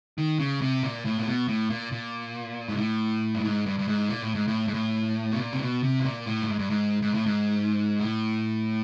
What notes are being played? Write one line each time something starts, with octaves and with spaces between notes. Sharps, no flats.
D#3
C#3
C3
A#2
A2
A#2
B2
A2
A#2
A#2
G#2
A2
G2
G#2
G2
G2
G#2
A#2
A2
G#2
A2
G#2
A2
B2
A#2
C3
B2
C3
B2
A#2
A2
G2
G#2
G2
G#2
G#2
A2
G#2
A2